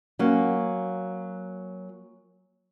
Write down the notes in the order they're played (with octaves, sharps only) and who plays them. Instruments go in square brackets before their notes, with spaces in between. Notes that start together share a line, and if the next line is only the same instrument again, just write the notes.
[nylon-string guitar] F#3 A#3 C#4